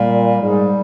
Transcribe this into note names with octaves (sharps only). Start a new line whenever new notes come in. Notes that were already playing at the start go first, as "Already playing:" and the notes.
Already playing: A#2 G3
G#2 G3